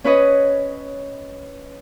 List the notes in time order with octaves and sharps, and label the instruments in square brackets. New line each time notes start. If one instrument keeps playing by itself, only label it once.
[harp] C#4 B4 C#5 D#5